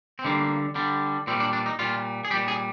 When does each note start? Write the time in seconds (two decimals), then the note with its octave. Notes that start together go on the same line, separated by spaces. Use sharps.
0.19 C4
0.24 D3 G3 A#3
0.75 D3 G3
1.27 A#2 G3 C4
1.40 D4
1.53 D4
1.66 D#4
1.79 A#2 G3 F4
2.25 G#4
2.31 G3 G4
2.34 A#2
2.48 G#4